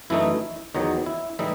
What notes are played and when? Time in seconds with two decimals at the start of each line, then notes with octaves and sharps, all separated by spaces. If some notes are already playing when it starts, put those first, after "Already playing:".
0.10 F#2 E3 A3 D#4 E4
0.75 E2 D#3 F#3 D#4
1.06 E4
1.39 A2 E3 G3 D#4 E4